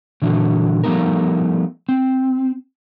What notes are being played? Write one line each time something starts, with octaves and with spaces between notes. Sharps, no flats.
A#2 D3 E3 F#3
F3 G3 A3 B3 D#4 A#4
C4